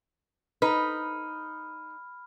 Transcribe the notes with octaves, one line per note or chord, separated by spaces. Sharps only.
D#4 B4 B5 F6